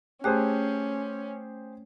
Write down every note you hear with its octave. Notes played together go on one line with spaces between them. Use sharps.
A3 C#4 G4 G#4 C5 F#6